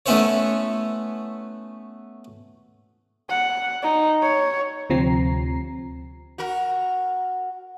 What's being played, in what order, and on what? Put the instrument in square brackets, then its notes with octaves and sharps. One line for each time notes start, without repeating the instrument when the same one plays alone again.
[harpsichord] A3 B3 C#4 E4 C5 C#5
[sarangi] F#5
D#4
C#5
[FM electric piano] D2 C3 F3 C4 A#5 C7
[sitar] F#4 A#4